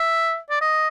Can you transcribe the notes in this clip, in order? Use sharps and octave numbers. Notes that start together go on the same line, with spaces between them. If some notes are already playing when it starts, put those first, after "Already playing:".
Already playing: E5
D5
D#5